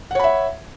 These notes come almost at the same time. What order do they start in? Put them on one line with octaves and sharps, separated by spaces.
F#5 C#5 B5 E5